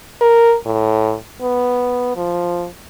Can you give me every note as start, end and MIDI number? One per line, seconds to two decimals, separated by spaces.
0.21 0.55 70
0.65 1.15 45
1.42 2.14 59
2.16 2.66 53